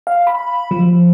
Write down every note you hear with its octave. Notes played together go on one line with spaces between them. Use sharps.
F5
B5
F3